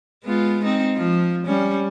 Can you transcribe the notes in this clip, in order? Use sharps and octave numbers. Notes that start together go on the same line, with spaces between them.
G#3 B3 F4
C4 D#4
F3
G3 C#4